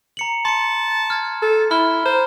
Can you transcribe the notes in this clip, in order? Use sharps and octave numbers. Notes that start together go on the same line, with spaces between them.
A#5 C#7 F#7
A5 C6 C#7
F6 G#6
A4
E4 B5 F6 G7
C5 A#5